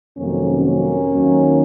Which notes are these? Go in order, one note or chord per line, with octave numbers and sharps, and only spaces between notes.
F2 C3 D#3 F#3 A#3 C#4
A#3 C#4
D#2 D#3 F#3